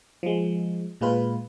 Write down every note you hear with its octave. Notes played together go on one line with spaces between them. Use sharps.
F3 G#3
A#2 G#3 F4 B4